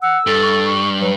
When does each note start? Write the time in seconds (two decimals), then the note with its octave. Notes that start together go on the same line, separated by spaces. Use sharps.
0.02 F#5 E6
0.27 G2 A4
0.42 C#6
0.64 C#6
1.01 F#3 B4